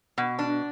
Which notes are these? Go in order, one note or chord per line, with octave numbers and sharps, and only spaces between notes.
B2
D4